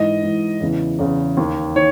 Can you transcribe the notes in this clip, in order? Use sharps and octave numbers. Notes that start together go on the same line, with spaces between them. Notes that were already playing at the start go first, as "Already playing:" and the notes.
Already playing: G#2 E3 D#5
G#2 E3
E2 C#3 E3
E2 C#3 E3
D#2 D#3
D#3 C#5